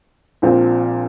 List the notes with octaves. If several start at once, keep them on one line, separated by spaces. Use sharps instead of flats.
A#1 A#2 F3 C4